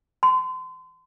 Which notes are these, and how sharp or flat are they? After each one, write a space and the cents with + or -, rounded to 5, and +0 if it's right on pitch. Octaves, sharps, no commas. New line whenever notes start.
C6 -35